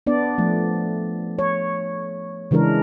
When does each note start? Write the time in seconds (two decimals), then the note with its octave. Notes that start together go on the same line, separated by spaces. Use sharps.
0.07 B3 D4 D5
0.38 F3 A3
1.39 C#5
2.51 C#3 E3 G#3 D4 A#4